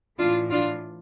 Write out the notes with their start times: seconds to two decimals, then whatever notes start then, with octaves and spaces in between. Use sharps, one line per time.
0.18 A2 E3 D4 F4
0.51 D4 F4